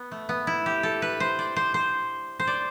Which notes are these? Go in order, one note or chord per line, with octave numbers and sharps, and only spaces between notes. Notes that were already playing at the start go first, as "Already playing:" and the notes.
Already playing: B3
A3
B3
E4
G4
A4
B4
C5
D5
C5
C5
C5
D5